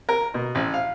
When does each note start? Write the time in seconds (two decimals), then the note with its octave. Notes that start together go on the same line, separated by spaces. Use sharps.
0.09 A#4
0.34 B2
0.55 A1
0.74 F5